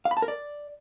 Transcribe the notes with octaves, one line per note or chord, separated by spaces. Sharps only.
F5
B5
A5
A#4
D5